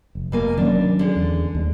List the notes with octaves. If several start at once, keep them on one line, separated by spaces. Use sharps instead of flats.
F1
B2 A#3 G#5
D#3 F#3 C#4 D4
D3 G#3
E2
D#2 G#3